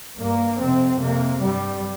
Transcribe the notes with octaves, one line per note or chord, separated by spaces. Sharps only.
G2 A#3
F2 C3 C4
F2 C3 A#3
G2 G3